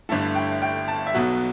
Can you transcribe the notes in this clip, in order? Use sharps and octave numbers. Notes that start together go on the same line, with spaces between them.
G1 G2 D3 A3 E4 A4
G5
G5
A5
E5
B1 B2 F#3 F#5